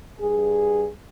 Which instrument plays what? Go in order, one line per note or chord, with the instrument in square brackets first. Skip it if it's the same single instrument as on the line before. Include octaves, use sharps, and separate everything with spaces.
[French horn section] G2 G#4